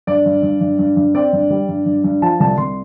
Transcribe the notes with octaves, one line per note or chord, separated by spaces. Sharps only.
G2 D5
G2
G2
G2
G2
G2
C4 D5
G2
G3
G2
G2
G2
F3 A5
C2 A5
C2 C6